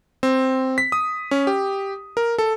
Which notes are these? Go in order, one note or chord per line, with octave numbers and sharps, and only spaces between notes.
C4
B6
D#6
C#4
G4
A#4
A4